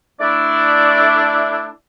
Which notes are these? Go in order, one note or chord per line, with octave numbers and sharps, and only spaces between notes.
A3 D4 E4 D5